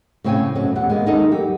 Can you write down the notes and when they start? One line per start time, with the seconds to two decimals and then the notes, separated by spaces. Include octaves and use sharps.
0.24 A2 C#3 C4 C#5 G5 G#5
0.55 B2 F#3 A3 C#4
0.75 E2 C4 G4 F#5
0.89 G#3 A#3 B3
1.06 D#2 D#4 E4 A4 A#4 D#5
1.31 F#3 G4